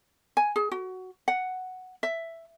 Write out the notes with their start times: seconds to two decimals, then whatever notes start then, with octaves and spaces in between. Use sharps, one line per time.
0.37 G#5
0.56 G#4
0.71 F#4
1.28 F#5
2.03 E5